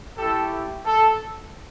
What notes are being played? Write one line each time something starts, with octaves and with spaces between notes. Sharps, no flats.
A3 E4 G4 A4
A4